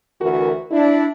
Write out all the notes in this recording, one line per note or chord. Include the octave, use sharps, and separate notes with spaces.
D2 E3 F#4 A#4
D4 E4